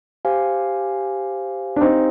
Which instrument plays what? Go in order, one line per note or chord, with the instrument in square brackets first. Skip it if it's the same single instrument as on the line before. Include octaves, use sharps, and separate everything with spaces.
[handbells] G4 C5 F5 G#5
[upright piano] D4
C4 D#4